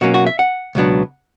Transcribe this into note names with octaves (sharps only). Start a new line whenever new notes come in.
B2 F#3 A#3 C#4 F#4
F#4
E5
F#5
C#2 B2 F#3 B3 D4